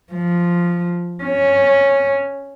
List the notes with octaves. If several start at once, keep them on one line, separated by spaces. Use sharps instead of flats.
F3
C#4